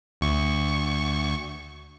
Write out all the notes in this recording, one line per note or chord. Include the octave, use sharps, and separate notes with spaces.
D2 C#6